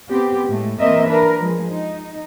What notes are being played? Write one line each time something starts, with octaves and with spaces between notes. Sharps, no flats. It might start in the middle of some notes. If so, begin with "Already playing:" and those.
B3 C4 G4
A2 G#3 A3
E3 A#3 C4 A#4 D#5 E5
D4 A#4 B4
F3 G#3
D#4